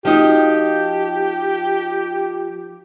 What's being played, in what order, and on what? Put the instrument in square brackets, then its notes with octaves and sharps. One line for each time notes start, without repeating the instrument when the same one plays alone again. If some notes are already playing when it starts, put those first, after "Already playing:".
[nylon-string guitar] F3 D#4 F#4 [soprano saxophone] G4